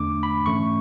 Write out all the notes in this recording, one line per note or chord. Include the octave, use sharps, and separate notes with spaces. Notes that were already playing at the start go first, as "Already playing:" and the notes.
Already playing: E2 D3 A3 D4 D6
B5
G#2 E3 A3 C#4 C#6